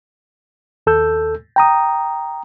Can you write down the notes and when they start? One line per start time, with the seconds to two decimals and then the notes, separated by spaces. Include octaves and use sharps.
0.87 D#2 A4 E6 G6
1.56 G5 A#5 D#6